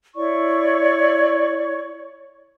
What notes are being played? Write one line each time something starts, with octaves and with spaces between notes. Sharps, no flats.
E4 C#5 D5 C#6